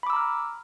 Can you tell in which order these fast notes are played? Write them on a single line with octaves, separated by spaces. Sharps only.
B5 D6 E6 A#5 F6